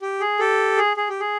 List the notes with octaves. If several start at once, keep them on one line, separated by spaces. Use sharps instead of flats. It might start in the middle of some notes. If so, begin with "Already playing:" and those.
G4
G#4
G4 A4
G#4
G#4
G4
G#4